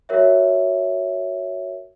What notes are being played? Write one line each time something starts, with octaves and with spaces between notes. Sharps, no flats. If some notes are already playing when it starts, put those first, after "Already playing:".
F#4 A#4 C#5 E5